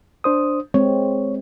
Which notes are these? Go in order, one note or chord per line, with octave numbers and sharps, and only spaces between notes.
D4 C5 D#6
G#3 C4 C#5